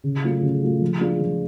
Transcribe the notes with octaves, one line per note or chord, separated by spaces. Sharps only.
C#3
F#3 A3 F4
C#3
F#3 A3 F4
F3
G#3 D4 F4
F3